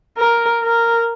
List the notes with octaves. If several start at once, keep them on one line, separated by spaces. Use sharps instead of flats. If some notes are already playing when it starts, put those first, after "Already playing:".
A#4
A#4